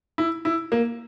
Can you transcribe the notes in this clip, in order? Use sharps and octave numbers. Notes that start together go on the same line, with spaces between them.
E4
E4
A#3